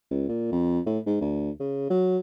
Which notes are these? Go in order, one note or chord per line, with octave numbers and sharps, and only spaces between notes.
C#2
A#2
F2
A2
G#2
D2
C#3
F#3